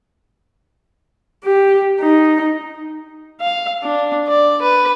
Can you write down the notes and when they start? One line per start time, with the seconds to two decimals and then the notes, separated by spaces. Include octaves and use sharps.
1.44 G4
2.01 D#4
3.41 F5
3.83 D4
4.28 D5
4.62 B4